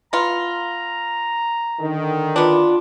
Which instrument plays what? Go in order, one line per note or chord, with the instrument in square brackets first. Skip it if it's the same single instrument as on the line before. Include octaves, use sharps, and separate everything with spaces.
[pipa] B3 F4 [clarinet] A#5
[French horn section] D3 D#3
[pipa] B3 D4 [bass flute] F4